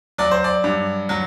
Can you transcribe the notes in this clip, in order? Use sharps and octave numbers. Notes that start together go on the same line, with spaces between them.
F#3 D5
C5
D5
G2
F#3